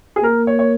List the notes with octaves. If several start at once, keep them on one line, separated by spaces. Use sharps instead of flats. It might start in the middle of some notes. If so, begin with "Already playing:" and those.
G#4
A#3 A#4
C#5
C#5